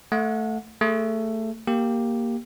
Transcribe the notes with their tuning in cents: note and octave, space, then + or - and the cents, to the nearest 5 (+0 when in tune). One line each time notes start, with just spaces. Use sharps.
A3 +0 F#5 -30
A3 +15 G#4 +0
A#3 +0 G4 +0